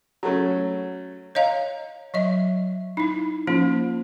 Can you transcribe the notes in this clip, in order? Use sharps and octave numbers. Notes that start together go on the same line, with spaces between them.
F#3 A3 C#4
C#5 D#5 F5 A#5
F#3 D#5 E5
D#4 E4
F3 A#3 C#4 F4